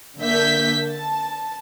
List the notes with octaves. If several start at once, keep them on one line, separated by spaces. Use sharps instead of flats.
D3 A#3 E5 G6 B6
A5